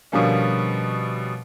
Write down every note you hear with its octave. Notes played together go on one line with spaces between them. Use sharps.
B2 D3 F3 G3 A#3 C#4